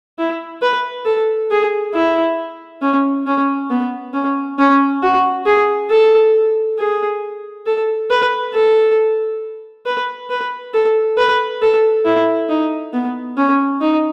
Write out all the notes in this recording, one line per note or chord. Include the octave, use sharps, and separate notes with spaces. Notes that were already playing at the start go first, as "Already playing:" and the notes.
E4
B4
A4
G#4
E4
C#4
C#4
B3
C#4
C#4
F#4
G#4
A4
G#4
A4
B4
A4
B4
B4
A4
B4
A4
E4
D#4
B3
C#4
D#4